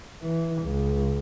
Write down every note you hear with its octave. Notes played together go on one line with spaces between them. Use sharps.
E3
C#2